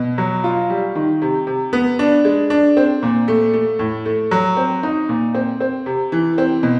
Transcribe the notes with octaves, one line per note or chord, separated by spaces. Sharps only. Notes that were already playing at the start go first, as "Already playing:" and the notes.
Already playing: B2
F#3
F4
G3
D#3
C3
C3
B3
D4
G#3
D4
C4
A#2
A3
A3
A2
A3
F#3
C4
D#4
A#2
C4
C4
C3
E3
C4
B2